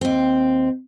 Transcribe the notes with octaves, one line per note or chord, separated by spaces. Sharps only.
D#2 C4